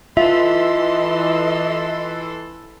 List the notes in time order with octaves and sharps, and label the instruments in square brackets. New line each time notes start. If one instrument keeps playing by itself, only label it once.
[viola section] E3 A4 C6 [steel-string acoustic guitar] F4 [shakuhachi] D#5 [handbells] E5